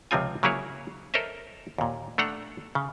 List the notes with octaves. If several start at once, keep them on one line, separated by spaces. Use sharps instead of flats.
C#2 C3 F3 C4 F4 G#5
C#3 F#3 A#3 E4 G#4 C#5
A4 A#4 C5 C#5 D#5 E5
D#2 A#2
A3 D4 A4 F#5 A#5
C#3